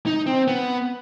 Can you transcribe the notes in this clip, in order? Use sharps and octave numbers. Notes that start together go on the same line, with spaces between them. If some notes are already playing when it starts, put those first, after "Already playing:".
D#4
C4
B3